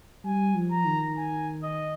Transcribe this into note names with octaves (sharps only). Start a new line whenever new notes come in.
G3 G#5
F3
A#5
D#3
G#5
D#5